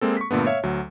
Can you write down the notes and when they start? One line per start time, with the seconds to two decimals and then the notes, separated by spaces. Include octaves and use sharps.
0.01 G#3 A#3 C4 A4
0.17 C#6 B6
0.31 G2 A#2 D3 A3 B3
0.47 C#5 E5 F5
0.63 D2 F#3